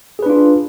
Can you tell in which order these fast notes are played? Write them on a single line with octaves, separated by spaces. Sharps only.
G#4 B4 D4 F4